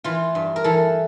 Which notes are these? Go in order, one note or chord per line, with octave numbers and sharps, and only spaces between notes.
E3 F4
G2
A#4
E3 A4